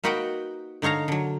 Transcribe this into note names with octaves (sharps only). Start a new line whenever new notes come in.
A#3 D#4 F#4 B4 F#5 G5
D3 D#4 C#5 F5 A#5
D3 F#3